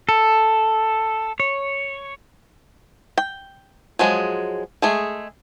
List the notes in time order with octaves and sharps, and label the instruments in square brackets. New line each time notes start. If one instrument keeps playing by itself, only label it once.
[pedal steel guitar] A4
C#5
[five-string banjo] G5
F3 F#3 G#3 G#4
G#3 A3 G#4